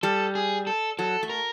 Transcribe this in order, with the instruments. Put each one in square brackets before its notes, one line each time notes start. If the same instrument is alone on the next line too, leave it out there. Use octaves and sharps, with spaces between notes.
[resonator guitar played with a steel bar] G3 [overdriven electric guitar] A4
[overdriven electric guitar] G#4
A4
[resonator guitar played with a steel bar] F#3 [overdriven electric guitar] A4
[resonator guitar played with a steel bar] A3
[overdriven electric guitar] A#4